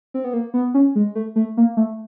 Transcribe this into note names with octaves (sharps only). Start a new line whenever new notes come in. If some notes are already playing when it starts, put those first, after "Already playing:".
C4
B3
A#3
B3
C#4
G#3
A3
A3
A#3
A3